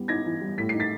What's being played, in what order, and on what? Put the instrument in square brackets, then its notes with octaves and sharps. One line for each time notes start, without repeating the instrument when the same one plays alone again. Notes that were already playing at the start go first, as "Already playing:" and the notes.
Already playing: [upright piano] G3 B3
D#4 G#6 A#6
E3
G3
A2 B6
C7
D#4
A6 B6